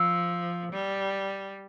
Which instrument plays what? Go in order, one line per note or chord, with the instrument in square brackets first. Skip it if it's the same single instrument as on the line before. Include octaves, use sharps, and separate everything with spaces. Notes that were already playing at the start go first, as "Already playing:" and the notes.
Already playing: [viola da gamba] F3 [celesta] E6
[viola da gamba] G3